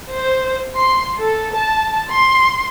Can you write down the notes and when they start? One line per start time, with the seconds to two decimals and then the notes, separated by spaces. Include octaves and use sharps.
0.13 C5
0.76 C6
1.19 A4
1.56 A5
2.11 C6